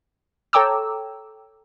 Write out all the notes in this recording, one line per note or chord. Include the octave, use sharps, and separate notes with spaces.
A4 C#5 G5 A#5 D6 E6